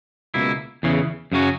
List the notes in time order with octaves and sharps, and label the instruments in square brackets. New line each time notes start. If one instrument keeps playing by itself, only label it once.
[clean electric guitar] C#2 B2 A#3 E4
E2 C#3 E3
F#2 C#3 F#3 C#4 F#4